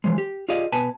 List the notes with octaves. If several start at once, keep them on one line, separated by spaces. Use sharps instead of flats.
E3 F3 G#3
G4
F4 G4 G#4 D5 D#5 F5
B2 B4 G#5 A5